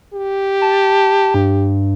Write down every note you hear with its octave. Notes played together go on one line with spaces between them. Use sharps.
G4
A5
G2